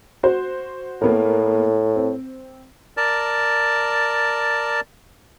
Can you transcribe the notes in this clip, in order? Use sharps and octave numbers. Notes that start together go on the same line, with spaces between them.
F#4 C5
A2 A#3 B3 A#4
C4
A#4 D5 A5